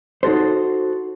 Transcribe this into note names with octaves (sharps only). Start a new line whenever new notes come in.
D#4 F#4 A4 C5